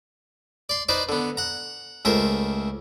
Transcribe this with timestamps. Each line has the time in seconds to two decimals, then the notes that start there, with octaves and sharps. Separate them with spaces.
0.69 D5 C6
0.89 D#4 B4 C5 D5
1.09 D3 B3
1.37 F#5 A#5
2.05 C#2 A3 A#4 C5